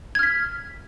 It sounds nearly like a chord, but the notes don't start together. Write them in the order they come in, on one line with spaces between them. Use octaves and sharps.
G#6 F6 B6